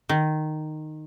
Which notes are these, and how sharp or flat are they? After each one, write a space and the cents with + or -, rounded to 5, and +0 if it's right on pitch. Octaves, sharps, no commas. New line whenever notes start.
D#3 -10